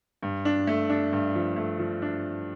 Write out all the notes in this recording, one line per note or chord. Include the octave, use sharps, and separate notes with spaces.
G2
D4
A3
D4
G2
F3
A3
F3
D4